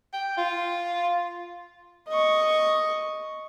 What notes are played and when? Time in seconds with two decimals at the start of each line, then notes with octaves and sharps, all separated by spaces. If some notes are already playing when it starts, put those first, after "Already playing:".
0.13 G5
0.37 F4
2.08 D#5 C#6